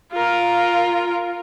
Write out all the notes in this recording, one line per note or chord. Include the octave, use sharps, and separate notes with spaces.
F4 A#4